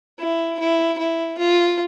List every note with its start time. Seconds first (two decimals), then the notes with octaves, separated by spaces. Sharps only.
0.19 E4
0.59 E4
0.98 E4
1.38 F4